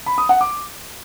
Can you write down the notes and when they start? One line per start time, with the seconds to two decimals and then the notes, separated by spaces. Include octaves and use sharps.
0.06 B5
0.18 D#6
0.29 F#5
0.41 D6